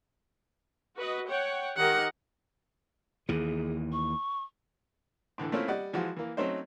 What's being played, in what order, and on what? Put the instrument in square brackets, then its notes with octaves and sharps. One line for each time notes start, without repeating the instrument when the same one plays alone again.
[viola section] F#4 B4 D#5
C#5 F#5 G5
[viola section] D#3 G4 D#5 [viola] A#4 F#5
[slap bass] D#2 E3 [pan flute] G#4
[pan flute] C#6
[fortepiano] A2 D3 E3 A4
A3 A#3 C4 C#4 E4 F4
G3 D5 D#5 F#5
E3 F3 G#3 F#4
E3 A#3
F#3 A3 C4 C#4 D#4 C5